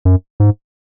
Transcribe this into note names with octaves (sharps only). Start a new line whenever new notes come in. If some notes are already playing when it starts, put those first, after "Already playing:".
F#2
G#2